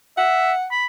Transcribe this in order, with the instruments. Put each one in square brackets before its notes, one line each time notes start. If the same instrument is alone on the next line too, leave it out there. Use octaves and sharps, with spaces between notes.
[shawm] E5 [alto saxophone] F#5
[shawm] B5